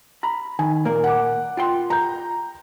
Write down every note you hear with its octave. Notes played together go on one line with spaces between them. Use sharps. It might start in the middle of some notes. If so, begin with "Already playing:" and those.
A#5 B5
D#3 G#5
A#2 A#3 A#4
F#5 D6
F4 G5 C6
A#5 G6